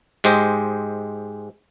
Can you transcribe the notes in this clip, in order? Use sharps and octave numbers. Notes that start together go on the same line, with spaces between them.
G#2 G#3 G4 C5 D#5